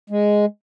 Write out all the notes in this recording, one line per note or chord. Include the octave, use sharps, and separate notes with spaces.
G#3